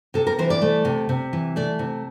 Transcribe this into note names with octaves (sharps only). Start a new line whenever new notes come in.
C3 A4
A#4
E3 C5
D5
A3
C3
C3
E3
A3 D5
C3